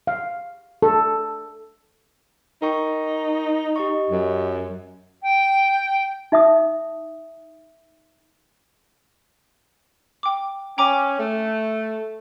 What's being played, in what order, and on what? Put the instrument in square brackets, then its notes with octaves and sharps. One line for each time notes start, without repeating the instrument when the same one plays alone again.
[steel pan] F5
A4
[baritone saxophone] D#4 [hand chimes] A#4 G5 C#6
[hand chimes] G4 D#5 C#6
[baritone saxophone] F#2
[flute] G5
[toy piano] D#4 E5 A5 D#6
[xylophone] G5 D6
[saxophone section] C#4 [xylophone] G5 A#5 D6
[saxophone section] A3